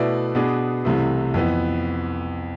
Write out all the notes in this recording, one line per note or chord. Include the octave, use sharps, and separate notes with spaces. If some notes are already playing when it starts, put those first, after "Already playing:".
Already playing: B2 A3 E4 B4 D5
B2 B3 D4 G#4
C2 C3 E3 A3
F2 E3 B3